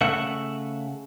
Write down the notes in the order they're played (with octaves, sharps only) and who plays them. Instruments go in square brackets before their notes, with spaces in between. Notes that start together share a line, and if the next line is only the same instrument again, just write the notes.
[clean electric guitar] C#3 A3 E5 F#5